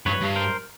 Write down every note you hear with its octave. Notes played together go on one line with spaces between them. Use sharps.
G2 B4 C#5
G2
A#4 C5